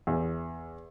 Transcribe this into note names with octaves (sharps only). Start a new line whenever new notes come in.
E2